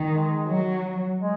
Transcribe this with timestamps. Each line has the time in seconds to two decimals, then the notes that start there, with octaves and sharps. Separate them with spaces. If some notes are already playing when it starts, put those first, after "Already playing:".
Already playing: D#3
0.12 G#3
0.47 F#3
1.19 G#3